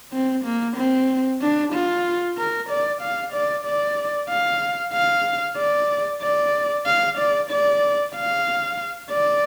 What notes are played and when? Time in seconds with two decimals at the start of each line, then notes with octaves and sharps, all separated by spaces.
0.13 C4
0.45 A#3
0.77 C4
1.42 D4
1.73 F4
2.38 A#4
2.70 D5
3.02 F5
3.33 D5
3.65 D5
4.30 F5
4.93 F5
5.58 D5
6.22 D5
6.86 F5
7.18 D5
7.50 D5
8.14 F5
9.11 D5